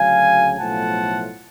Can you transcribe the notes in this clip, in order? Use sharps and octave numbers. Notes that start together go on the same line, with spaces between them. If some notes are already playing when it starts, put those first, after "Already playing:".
Already playing: D2 C#3 F#3 F5 G#5
B1 A2 F3 A3 F4 F#5 A5